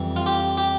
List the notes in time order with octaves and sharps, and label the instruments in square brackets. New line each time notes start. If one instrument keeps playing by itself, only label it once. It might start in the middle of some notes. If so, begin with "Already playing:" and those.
Already playing: [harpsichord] F2 E3 G3
F4
G4
G4